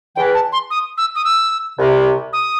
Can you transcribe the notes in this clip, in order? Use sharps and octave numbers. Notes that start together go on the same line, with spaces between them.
E2 E3 G5
A5
C6
D#6
E6
D#6
E6
C2 C3
D#6